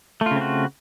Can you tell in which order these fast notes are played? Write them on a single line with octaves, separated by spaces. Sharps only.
A3 F4 C#3 C4 F#4